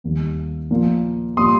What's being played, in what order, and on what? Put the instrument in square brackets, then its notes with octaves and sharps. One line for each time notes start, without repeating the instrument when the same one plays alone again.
[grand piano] D#2 D#3 G3 A#3
A#2 F3 A#3
A#2 G3 A#3 C6 D#6